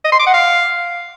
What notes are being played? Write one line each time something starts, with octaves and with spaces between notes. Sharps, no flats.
D#5
C6
D6
F#5
F5